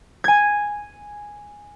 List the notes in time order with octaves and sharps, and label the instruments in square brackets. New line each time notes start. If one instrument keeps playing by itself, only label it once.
[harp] G#5 G#6